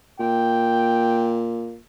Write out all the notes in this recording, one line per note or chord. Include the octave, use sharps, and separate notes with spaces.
A#2 G5